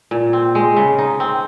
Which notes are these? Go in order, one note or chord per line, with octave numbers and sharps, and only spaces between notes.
A#2
C4
G#3
C#3
D#4
C4